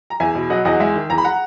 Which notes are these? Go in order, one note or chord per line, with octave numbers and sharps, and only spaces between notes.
A#5
E2 E5 G#5
B2
F#3 D#5 F#5
E2 D#5 F#5
G#3 E5 G#5
D#3
E2 A#5
B5
F#5 A#5